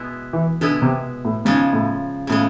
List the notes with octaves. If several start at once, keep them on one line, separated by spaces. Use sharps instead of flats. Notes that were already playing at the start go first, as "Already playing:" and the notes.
Already playing: B2 G#3 B3 E4
E3
B2 D3 G#3 B3 E4
C3
A2
G#2 C#3 F3 G#3
A2
A2 C#3 F3 G#3